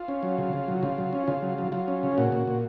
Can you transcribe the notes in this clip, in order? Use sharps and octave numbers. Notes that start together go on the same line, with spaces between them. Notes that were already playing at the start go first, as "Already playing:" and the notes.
Already playing: F4
C#4
F#3
C#3
C#3
F#3
C#3 F4
F#3
C#4
C#3 F4
F#3
F#3
F#3 F4
C#4
C#3
A#2 F#4
A#2
A#2